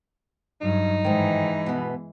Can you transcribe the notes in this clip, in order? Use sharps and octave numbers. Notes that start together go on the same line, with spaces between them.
G2 F#3 D#4
G#2 D#3 E3 G#3
B2 B3